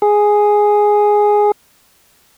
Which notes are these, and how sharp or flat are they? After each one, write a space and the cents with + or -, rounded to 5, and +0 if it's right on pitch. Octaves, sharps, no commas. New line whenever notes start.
G#4 +0